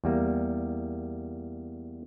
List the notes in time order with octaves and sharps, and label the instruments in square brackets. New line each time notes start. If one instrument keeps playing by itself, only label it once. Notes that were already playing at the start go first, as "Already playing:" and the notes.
[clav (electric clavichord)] E2 G3 A#3